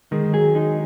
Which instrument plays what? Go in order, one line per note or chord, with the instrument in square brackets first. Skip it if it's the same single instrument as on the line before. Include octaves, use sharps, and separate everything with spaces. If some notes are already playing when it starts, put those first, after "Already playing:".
[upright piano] D#3 [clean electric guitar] G#3
[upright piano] F#3 [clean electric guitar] G#4
[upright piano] G#3 [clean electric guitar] D#4